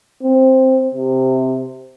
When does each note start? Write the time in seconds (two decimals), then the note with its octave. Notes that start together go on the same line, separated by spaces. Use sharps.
0.23 C4
0.95 C3